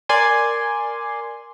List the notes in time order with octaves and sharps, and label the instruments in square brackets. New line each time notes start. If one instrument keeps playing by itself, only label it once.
[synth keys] A#4 D5 G#5 C6